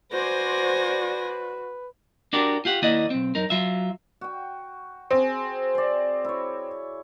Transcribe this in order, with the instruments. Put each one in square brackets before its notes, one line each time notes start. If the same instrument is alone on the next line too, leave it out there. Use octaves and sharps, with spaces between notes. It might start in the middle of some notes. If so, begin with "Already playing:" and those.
[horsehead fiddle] F#4 [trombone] B4 [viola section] C5 D5 [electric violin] G#5 A#6
[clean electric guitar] D4 F#4 G4 A#4 D5
F4 G4 F#5
D#2 A#3 E4 D5 D#5 F#5
B1 C4
F#2 D#4 A#4
F#3 F4 E5
[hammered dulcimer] F#4 G5
[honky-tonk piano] C4 [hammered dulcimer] G#4
[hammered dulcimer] C5 D5
E4 C#5